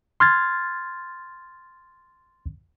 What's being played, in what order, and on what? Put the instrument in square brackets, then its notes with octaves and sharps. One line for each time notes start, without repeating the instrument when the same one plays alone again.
[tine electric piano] C6 F6 G#6 A6